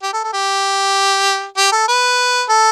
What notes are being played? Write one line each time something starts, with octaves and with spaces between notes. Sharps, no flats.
G4
A4
A4
G4
G4
A4
B4
A4